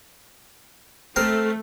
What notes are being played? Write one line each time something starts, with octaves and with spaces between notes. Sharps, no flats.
A3 C4 A#4